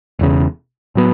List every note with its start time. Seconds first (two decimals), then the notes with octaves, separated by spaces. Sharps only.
0.19 E1 E2 C#3
0.95 A2 F#3 B3